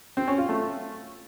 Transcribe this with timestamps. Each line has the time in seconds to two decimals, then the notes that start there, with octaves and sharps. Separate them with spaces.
0.17 C4
0.28 C#4
0.38 F4
0.49 A3